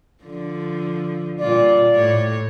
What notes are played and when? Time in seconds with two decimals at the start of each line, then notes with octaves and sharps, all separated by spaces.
0.24 D3 F3
1.40 A#2 G3 F4 D5
1.95 A2 C#5